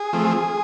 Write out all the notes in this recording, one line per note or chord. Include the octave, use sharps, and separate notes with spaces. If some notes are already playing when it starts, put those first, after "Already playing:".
Already playing: G#4
F3 A3 C4